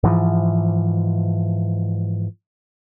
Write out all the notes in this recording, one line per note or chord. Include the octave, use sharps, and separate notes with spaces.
G#2 E3 F3